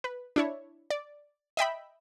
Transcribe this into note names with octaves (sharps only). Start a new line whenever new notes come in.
B4
D4 E4 C#5
D5
D#5 E5 G5 B5